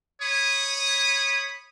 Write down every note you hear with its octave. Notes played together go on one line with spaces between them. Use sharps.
C#5 B5 D#6